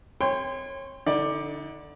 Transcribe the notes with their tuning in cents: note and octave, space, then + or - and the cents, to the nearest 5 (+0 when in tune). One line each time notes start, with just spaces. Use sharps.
C#5 -25 G5 +30 C6 -20
D3 +0 D#4 +40 D5 +10